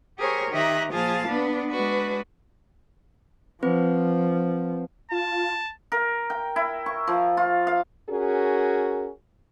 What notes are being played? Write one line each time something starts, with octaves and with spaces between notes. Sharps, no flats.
G4 G#4 A#4 C5 C#5
D#3 G4 D#5 E5 A#5 F#6
A#2 F3 F4 G#4 F5 A5
B3 D4 B4
G#3 D4 F#4 B4
F3 C4 B4
F4 A5
A#4
G5
E4
C#6
F3
F4
F5
C#4 F#4 G#4 A#4